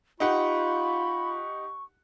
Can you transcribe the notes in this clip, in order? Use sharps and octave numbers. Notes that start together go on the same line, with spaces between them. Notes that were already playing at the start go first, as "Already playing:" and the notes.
D#4 F4 G4 F#5 B5 C#6